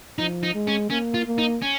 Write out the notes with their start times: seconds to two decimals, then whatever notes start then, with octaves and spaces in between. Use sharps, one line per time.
0.18 F3 D#4
0.43 D#4
0.55 G#3
0.67 C#4
0.90 A#3 C#4
1.14 F4
1.26 A#3
1.38 D#4
1.62 C#4